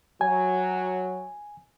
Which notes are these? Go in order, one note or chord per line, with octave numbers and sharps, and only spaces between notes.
F#3 G#5